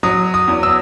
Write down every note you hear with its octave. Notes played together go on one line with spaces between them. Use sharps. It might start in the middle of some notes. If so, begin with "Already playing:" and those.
F#3 D#6
D#6
E2
E6